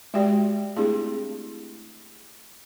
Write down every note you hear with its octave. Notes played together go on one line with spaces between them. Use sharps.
G#3 F#4 G4 D5 G5
A3 C4 D4 E4 G4 G#4